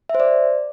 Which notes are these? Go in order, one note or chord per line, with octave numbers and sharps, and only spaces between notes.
E5
C5
D5